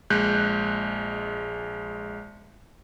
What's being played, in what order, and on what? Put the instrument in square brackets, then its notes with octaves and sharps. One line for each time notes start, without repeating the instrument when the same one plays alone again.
[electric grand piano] A#1 G#3 F#6 G6